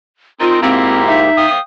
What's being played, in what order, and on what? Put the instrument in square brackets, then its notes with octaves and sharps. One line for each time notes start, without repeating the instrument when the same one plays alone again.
[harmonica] C4 D#4 A#4 [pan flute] F4 [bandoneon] C5
[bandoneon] G#2 A#3 G4 [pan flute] C4 [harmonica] E4 F4 A#5
[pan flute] D#4 [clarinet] E5
[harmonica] F5 G5 D#6